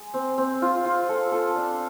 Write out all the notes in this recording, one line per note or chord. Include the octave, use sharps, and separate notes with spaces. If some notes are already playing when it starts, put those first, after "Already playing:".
Already playing: G#3
C4
C4
F4
F4
A4
A4
D4